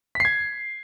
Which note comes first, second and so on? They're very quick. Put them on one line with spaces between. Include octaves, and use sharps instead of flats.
B6 C7 G#6